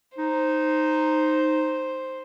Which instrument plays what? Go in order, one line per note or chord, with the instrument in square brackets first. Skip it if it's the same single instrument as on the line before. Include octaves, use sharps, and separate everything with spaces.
[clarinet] D#4 [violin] C5